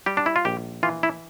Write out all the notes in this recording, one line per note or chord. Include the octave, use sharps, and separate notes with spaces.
G3 G4
D4
E4
F4
A#1 G4
E3 F4
E4